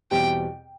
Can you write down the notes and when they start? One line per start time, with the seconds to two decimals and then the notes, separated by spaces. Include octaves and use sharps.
0.11 E2 B2 G3 C4 G4 G5